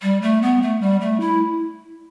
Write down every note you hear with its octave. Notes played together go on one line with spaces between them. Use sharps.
G3
A3
B3
A3
G3
A3
E4